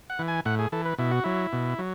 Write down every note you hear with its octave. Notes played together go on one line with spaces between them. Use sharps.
F#5
E3
G#5
A2 F#5
G#4
E3 A4
B4
B2 E4
F#4
F#3 E4
B2
F#3